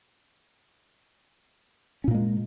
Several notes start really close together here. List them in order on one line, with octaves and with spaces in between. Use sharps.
C#4 A#2 A#3 G#3